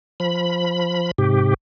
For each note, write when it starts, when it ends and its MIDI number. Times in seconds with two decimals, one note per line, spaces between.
0.20 1.11 53
0.20 1.11 83
1.18 1.54 44
1.18 1.54 48
1.18 1.54 67